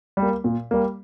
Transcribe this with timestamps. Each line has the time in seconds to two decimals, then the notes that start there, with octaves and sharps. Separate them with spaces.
0.17 G3
0.22 A#3
0.44 A#2
0.71 G3 A#3